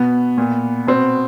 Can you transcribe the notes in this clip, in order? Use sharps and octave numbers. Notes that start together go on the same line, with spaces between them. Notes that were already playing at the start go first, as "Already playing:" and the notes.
Already playing: B2 B3
A#2
B2 C4